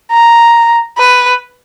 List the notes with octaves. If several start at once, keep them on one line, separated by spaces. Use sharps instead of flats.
A#5
B4